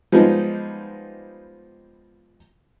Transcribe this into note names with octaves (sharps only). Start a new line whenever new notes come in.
F3 G3 G#3 B3 D#4